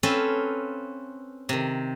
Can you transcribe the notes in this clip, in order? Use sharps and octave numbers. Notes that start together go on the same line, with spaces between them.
C4 C#4 A4 B4 E5 F5
C3 D#3